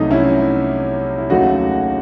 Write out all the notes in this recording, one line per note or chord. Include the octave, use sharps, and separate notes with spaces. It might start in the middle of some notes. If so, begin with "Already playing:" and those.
Already playing: C2 C3 F#3 A3 D#4
C#4 E4
E4
D#2 C#3 F#3 A3 D#4 F#4